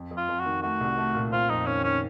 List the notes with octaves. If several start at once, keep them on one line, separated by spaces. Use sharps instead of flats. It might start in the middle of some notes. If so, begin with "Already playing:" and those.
Already playing: F2
F2
F4
F2
F#4
D#3
A3 F#4
C2
A3
A#2
C4 F4
F2 D#4
D#3 C#4
D#3 C#4